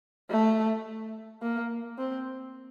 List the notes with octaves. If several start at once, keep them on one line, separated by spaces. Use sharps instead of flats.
A3
A#3
C4